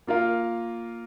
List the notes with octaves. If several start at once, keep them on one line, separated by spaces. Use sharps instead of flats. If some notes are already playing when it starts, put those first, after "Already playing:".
A#3 F4 A#4 F5